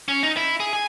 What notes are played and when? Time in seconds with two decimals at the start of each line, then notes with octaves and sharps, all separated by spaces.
0.08 C#4
0.23 D#4
0.37 E4
0.60 G#4
0.73 G#5